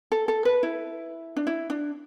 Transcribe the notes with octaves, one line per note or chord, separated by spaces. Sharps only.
A4
A4
B4
E4
D4
E4
D4